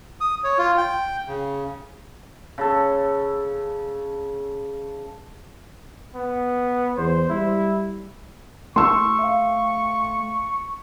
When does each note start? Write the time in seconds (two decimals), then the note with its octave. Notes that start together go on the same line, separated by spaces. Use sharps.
0.21 D#6
0.44 C#5
0.58 F4
0.78 G5
1.28 C#3
2.58 C#3 A4
6.15 B3
6.97 E2 C5
7.30 G3 E4
8.76 A3 C6 C#6 E6
9.19 E5 F5